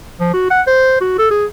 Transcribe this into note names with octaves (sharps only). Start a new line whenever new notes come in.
F3
F#4
F#5
C5
F#4
A4
G#4